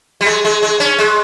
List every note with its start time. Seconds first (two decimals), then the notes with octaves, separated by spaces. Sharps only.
0.21 G3
0.26 G#3
0.45 G#3
0.62 G#3
0.80 C#4
0.98 G#3